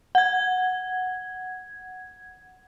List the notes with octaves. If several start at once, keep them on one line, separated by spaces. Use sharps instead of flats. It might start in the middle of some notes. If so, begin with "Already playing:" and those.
F#5 G#6